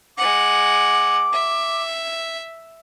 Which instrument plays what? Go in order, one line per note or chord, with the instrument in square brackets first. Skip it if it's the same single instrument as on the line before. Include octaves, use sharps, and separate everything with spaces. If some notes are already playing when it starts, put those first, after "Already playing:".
[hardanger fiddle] G#3 F#5 [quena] D6
[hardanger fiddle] E5